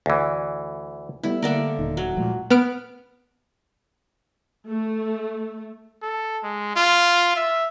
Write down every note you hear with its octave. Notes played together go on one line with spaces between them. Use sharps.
D2 E3
G3 A3 B3 E4
D3 A3 A#3 A#4 D5 E5 F#5
D#1 D#4
F#3
A#2 F3 G#3 A3
B3 F6 D7
A3
A4
G#3
F4
E5